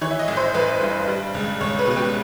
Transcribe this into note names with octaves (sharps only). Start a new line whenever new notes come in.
E3 C#5
E5
D#5
A1
C5
A1 B4
G2
G3
C#2
C#2 C#5
B4
B2
G4